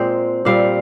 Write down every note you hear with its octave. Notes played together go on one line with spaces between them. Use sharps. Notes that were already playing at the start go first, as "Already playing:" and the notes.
Already playing: A#2 G#3 C4 C5
A#2 G3 C4 F5